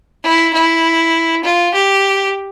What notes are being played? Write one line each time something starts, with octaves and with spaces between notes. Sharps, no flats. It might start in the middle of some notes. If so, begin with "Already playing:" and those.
E4
E4
F4
G4